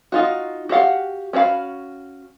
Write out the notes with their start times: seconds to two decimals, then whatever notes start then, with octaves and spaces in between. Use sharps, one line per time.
0.12 D#4 F4 F#4
0.69 F#4 G4 F5 F#5
1.33 C#4 F#4 C#5 F5 B5